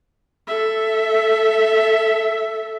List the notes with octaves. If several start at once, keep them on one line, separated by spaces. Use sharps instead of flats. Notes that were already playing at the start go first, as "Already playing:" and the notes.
A4 E5